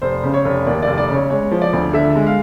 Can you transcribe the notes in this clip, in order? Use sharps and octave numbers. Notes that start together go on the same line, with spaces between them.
F1 C5
C#3
C#5
F1
D#2 D5
D5
F1
D5
C#3
C#5
G#3 C#5
F3
D5
D2
D3 E5
G#3
F5